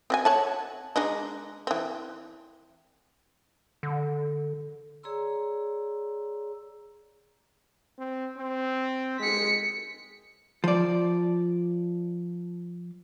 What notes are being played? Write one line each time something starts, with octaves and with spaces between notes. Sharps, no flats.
C4 F#4 G#5
C#5 F#5 A5
G#3 D4 D#4
E3 C4
D3
G#4 C#5 D5 A#5 C6 E6
C4
C4
G#3 B6 C#7
F3 D5